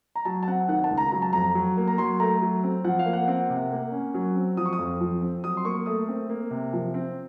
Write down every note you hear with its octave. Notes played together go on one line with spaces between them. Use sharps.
A#5
F#3 A5
A5
C4 F#5
D#3 F#5
F#5
A5
C#2
A#5
F#3 A#5
A5
F2 A#5
F#3
A#3
A#5
F#3 C6
A3 A#5
F#3
C4
F3 F#5
F5
A#3
F#5
C4 F#5
C3
A#3
C#4
F#3
C4
F3 D#6
C#6
D#6
F2
F3
C4
F#3 D#6
C6
A#3 C#6
A3 D#6
C4
A#3
C3
F3
C4